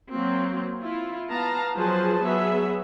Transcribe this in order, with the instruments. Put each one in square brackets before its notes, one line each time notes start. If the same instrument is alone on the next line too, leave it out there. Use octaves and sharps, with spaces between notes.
[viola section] F#3 A#3 C4
E4 F4
B3 F5 A5 A#5
F3 F#3 G#4 B4 C5 A5
F#3 B3 G#4 E5